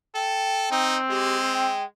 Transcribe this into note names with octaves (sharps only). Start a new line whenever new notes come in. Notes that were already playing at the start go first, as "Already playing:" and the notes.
A4 G5
C4 D#4
G#3 G4
G5